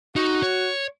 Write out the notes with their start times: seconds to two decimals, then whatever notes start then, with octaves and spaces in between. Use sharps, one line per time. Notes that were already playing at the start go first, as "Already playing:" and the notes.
0.16 D#4 F#4
0.43 C#5